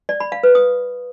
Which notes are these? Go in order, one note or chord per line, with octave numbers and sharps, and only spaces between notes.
D5
B5
F5
B4
D#6